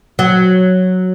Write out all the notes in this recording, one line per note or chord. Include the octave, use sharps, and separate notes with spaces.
F#3